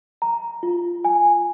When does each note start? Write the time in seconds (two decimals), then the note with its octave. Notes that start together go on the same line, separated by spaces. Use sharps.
0.22 A#5
0.63 F4
1.05 G#5